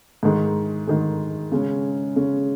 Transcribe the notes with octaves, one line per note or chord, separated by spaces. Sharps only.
G#2 D#3 G#3
G#2 D#3 G#3
C#3 G#3 C#4
C#3 G#3 C#4